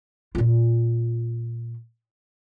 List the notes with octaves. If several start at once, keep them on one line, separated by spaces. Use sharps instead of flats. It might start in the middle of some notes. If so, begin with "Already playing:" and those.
A#2 F4